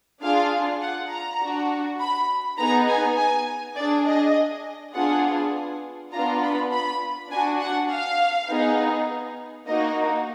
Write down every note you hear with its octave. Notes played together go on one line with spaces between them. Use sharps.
D4 F4 G#4 F5
F#5
A#5
D4 F#4
B5
B3 D#4 G#4 A#5
G#5
G#5
D4 G#4 D5
D#5
B3 D4 F4 G#4 F#5
B3 D4 F4 A#5
B5
B5
D4 F#4 G#5
F#5
F5
B3 D#4 G#4
A#3 D#4 F#4 D#5